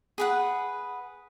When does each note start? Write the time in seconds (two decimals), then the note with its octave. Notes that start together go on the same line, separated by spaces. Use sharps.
0.18 G#4 B4 F#5